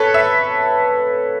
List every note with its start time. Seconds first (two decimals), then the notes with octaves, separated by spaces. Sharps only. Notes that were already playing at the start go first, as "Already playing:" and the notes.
Already playing: A4 B4 C#5
0.14 E5